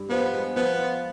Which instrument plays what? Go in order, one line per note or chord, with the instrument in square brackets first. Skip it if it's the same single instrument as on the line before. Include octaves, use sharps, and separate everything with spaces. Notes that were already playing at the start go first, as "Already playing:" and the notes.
Already playing: [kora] G2
[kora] F3 [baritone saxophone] B3
[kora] G#3
[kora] F3 [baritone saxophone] B3
[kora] F4